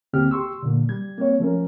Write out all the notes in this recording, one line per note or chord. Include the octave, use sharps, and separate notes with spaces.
D2 D3 A#3 C4 G4 F6
G4 C6 C#6 E6
A#2 D3 A#3
G3 G#6
A#3 C4 C#5
F3 A3 C#4 A#4